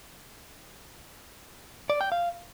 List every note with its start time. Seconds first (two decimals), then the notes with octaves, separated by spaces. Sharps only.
1.90 D5
2.01 G5
2.12 F5